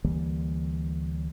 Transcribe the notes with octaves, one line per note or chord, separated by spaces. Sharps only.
D2 E3 G3 A#3